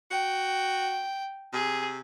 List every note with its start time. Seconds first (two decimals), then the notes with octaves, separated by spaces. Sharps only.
0.11 F#4 G5
1.53 C3 G#4